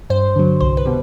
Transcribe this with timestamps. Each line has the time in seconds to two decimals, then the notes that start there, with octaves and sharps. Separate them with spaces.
0.10 G2 C5
0.36 D3 F#3
0.61 C2 C5
0.77 B4
0.86 B2 G3